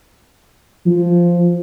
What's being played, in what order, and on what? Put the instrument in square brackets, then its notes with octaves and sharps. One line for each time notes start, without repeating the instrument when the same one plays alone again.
[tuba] F3